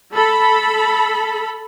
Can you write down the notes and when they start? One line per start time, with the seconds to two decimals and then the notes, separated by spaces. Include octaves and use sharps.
0.13 A4 B5